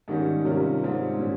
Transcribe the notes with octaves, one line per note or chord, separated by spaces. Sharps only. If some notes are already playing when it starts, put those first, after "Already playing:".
G#2 D#3 G3 C#4
C3 G3 C#4 F4 A#4
G#2 G3 C4
A#2 G3 C#4